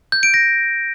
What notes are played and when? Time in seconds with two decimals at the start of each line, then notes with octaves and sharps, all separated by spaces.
0.12 G6
0.23 D7
0.34 A#6